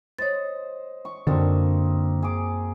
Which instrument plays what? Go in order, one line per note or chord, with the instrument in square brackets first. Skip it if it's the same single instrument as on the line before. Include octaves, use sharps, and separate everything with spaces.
[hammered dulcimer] C5 D#5 [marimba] C#5 A6
[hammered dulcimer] C#6
[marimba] F#2 [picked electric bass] D3 D4 [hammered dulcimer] A#3 C4 D#4
[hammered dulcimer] G#4 D6